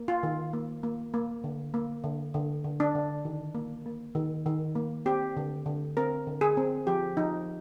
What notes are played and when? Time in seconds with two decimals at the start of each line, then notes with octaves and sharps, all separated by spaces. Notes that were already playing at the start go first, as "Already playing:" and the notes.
Already playing: A#3
0.08 F4
0.23 D#3
0.53 A#3
0.83 A#3
1.14 A#3
1.44 D3
1.74 A#3
2.04 D3
2.34 D3
2.64 D3
2.80 D4
2.95 D3
3.25 D#3
3.55 A#3
3.86 A#3
4.15 D#3
4.46 D#3
4.75 A#3
5.06 C4 G4
5.37 D3
5.66 D3
5.97 C4 A#4
6.27 D3
6.41 G#4
6.57 C4
6.87 F3 G4
7.17 F3 D#4